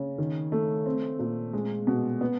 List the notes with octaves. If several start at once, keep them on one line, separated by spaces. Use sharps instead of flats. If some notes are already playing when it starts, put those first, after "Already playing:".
Already playing: C#3
D#3
A3
C4
A#2
G#3
B2
B3